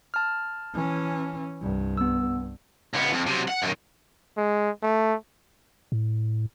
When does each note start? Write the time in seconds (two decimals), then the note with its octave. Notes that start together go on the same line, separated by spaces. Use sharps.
0.14 A5 F6
0.74 E3 C#4
1.61 C2 G2
1.97 B3 E6
2.94 C#2 B3
3.13 F2
3.27 C3 F#3
3.48 F#5
3.62 F#2 D#3
4.37 G#3
4.82 A3
5.92 A2